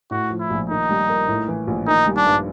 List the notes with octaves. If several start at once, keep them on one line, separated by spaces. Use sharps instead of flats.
A2 F#4
F3
E4
A#1
D#3 D#4
G3
A#3
A2
E3
A#1
D#3 D#4
G3
D4
G2